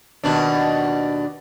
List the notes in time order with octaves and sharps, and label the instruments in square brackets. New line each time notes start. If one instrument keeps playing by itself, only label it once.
[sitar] D#2 B2 D4